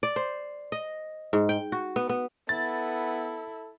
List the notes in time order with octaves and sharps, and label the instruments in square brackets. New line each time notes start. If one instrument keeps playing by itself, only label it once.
[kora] D5
C5
D#5
G#2
G5
F#4
B3
B3
[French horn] B3 [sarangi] E4 [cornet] A4 [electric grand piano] A6